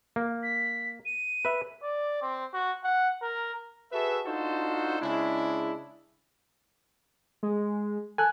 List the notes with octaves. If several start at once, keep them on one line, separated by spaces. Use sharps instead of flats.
A#3
B6
D#7
B4 E5
D5
C4
F#4
F#5
A#4
F#4 G#4 A4 B4 E5
D4 D#4 F4 F#4 A4 C5
C#3 G#3 D4 E4
G#3
A4 G#5 F#6